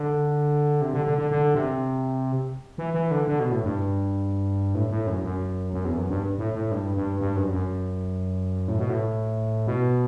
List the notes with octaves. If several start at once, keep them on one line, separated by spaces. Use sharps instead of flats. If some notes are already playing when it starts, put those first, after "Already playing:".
Already playing: D3
C3
D3
D3
D3
D3
C3
E3
E3
D3
D3
B2
A2
G2
A2
A2
F#2
F#2
F#2
E2
F#2
G2
A2
A2
G2
G2
G2
F#2
F#2
A2
B2
A2
B2